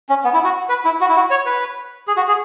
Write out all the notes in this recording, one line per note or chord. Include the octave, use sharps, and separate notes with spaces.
C#4
B3
E4
F#4
B4
E4
F#4
E4
F#4
C#5
B4
G#4
F#4
G#4